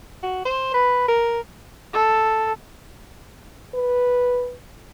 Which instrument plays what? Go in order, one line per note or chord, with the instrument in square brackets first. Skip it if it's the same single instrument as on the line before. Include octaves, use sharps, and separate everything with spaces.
[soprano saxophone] F#4
C5
B4
A#4
[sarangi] A4
[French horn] B4